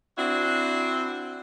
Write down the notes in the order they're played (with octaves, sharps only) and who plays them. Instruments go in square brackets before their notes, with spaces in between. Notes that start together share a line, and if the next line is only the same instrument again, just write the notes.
[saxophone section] C4 D4 E4 F#4